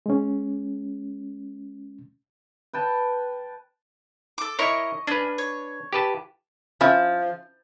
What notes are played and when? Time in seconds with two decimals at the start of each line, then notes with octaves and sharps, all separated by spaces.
0.06 G#3 C#4
2.73 B4 G5 A5
4.38 A4 D6
4.59 E4 A#4 C#5 D#5 C#6
5.07 C#4 D4 B4
5.38 C#5
5.93 G4 B4 A5
6.81 F3 C#4 E4